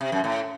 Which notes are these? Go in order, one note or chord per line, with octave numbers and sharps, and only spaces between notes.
C3
F#2
A2